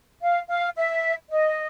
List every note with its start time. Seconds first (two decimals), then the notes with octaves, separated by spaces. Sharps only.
0.21 F5
0.49 F5
0.76 E5
1.30 D#5